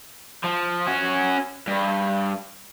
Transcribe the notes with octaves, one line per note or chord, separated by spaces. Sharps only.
F3
C#4 F#4
G2